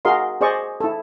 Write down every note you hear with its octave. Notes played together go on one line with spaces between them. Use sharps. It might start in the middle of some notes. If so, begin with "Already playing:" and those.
F#4 G#4 A#4 D#5 F5 C6
G#4 C5 D5 D#5 C#6
E4 A4